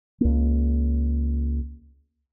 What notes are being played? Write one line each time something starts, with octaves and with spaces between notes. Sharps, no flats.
C#2 A#3